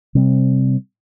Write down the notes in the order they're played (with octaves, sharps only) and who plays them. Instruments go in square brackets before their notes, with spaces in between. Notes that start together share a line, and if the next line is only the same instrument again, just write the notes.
[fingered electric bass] C3 G3 C4